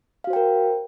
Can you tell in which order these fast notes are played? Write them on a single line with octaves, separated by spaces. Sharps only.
F5 F#4 C5 G5 A#4